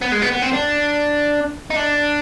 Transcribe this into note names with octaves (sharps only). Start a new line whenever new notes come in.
B3
G#3
B3
B3
C4
D4
D#4
D4